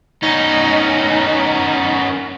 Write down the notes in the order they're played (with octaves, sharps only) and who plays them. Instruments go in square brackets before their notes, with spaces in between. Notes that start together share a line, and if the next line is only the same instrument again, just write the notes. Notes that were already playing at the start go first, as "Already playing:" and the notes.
[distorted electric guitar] B3 C#4 [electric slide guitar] D#4